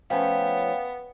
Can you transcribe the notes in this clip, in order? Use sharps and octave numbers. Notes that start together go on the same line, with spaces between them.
F3 A3 B3 C#4 F5 G5